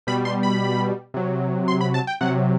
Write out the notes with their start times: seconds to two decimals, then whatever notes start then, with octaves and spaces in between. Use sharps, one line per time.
0.07 B2 G3 B5
0.25 C6
0.43 B5
1.14 C3 F#3
1.68 C6
1.81 B5
1.94 A5
2.07 G5
2.21 C3 F#3 F#5